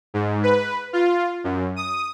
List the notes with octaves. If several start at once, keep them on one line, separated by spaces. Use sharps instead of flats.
G#2
B4
F4
F#2
D#6